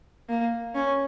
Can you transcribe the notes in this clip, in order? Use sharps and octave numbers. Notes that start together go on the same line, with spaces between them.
A#3
C#4